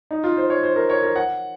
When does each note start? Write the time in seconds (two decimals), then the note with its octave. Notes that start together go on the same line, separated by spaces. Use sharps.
0.11 D#4
0.24 F4
0.37 C5
0.50 C#5
0.63 C5
0.76 A#4
0.90 C#5
1.03 A#4
1.16 F#5